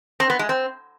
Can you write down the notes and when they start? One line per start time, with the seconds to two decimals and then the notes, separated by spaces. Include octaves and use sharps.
0.20 C4
0.30 B3
0.39 G#3
0.49 C4